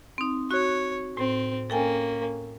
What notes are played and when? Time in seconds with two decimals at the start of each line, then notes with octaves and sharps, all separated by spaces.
0.18 C4 D#4
0.51 F#4 C#5 F#6
1.17 A2 C4
1.70 A#3 C#4 A4 G5 G#5